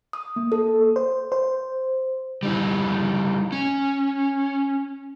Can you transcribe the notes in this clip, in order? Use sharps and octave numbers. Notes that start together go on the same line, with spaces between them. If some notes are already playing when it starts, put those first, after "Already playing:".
D#6
A#3
A4
C5
C5
G3 D#4 E4
C#4